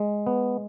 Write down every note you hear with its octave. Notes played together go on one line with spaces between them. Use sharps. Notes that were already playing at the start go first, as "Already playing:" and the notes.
Already playing: G#3
B3